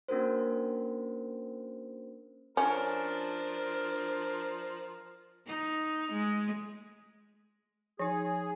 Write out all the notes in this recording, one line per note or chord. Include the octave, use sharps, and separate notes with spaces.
A#3 C#4 D4 F#4 A#4 C5
F3 C#4 D4 A#4
D#4
G#3
F3 D#4 G#4